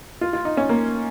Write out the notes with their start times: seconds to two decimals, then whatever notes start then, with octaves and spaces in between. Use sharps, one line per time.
0.21 F4
0.33 F4
0.45 D#4
0.57 C#4
0.69 A#3